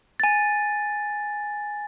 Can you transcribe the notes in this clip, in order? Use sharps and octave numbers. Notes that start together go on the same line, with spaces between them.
G#5 A6